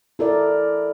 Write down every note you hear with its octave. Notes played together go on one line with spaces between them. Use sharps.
E4 A4 A#4 D5